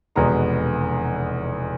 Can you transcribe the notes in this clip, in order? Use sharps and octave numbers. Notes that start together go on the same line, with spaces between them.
F1 E2 B2 G#3 B3 A#5